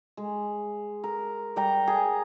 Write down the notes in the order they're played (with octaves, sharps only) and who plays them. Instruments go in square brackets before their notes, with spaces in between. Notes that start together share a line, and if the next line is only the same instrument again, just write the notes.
[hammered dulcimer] G#3
A#4
G3 G5 A#5
G#4